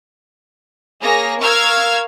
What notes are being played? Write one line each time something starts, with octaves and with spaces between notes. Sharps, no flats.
A#3 G#4 C#5 A#6
A#4 F5 C#6 E6 F6 G#6